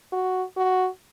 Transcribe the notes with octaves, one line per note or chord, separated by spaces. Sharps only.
F#4
F#4